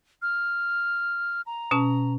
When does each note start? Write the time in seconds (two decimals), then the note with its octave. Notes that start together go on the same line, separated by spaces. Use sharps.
0.22 F6
1.46 A#5
1.71 B2 C#4 A5